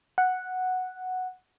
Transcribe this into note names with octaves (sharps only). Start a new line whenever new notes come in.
F#5